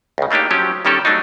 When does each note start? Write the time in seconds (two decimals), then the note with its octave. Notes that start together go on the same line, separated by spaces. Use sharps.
0.18 C#2 C#3
0.31 A3 A#3 D4 D#4 G4
0.50 F3 F#3 C#4 G4
0.85 D#3 G3 C#4 G4 A4 A#4
1.05 F#3 A3 D4 D#4